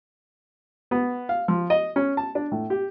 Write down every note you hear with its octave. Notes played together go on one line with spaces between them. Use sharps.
B3
F5
F3
D#5
C#4
A5
D4
A2
G4